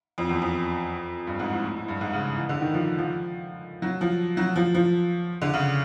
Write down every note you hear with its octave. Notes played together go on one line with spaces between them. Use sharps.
F2
E2
F2
G2
G#2
A2
A2
A2
G2
G#2
C#3
E3
D3
D#3
F3
F3
F#3
F3
F#3
F3
F3
D3
C#3